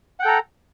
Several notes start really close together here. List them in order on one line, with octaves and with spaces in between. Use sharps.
F#5 G5 A4 A#5